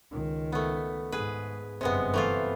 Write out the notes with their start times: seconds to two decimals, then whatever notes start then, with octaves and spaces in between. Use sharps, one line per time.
0.12 C#2 D#3
0.52 A3 B3
1.12 G#2 G#4 B4
1.81 G1 F#2 C3 G#3 B3
2.14 E3 A3 F4